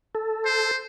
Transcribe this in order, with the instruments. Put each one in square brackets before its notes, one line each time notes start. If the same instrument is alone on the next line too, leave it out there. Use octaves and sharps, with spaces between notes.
[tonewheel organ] A4
[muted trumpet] C5